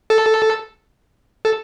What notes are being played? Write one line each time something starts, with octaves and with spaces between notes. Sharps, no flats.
A4
A4